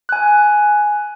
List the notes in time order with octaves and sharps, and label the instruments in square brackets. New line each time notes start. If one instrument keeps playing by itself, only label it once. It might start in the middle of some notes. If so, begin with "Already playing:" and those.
[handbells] G#5 F#6